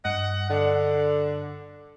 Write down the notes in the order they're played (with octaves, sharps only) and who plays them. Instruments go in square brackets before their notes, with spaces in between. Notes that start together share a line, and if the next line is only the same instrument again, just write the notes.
[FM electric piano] G2 [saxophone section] D#5 F#5
[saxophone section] D3